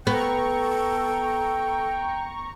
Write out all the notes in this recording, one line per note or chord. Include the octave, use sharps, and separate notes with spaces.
B3 A4 G5 A#5 C#6